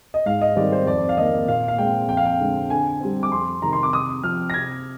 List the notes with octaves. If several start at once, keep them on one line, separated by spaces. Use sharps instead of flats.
D#5
G#2 F5
D#5
D#3 G3 C4 D5
C5
F2 D5
F5
D#3 A#3 D#5
A#2 F5
F5
G#3 C4 G5
F2 G5
F5
G5
D3 G#3 C4
D3 G#5
G3 C4
D6
F2 C6
C3 D#3 A#5
C6
D6
C3 D#6
F3 C4 F6
A#6
C3 G#6